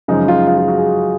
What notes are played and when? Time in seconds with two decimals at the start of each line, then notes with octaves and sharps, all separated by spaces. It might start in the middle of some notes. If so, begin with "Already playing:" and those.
0.08 F#2 C#3 F3 G#3 D#4
0.28 F4
0.47 F4
0.58 F4
0.68 F#4
0.78 G#4